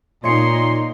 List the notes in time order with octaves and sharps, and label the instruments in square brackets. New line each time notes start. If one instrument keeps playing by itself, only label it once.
[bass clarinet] A#2 [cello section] A#3 D#4 [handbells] C#5 D#5 C#7 [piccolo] C6